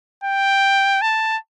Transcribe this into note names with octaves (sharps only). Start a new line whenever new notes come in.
G5
A5